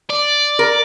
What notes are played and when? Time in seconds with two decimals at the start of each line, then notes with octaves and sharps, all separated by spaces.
0.10 D5
0.59 A#4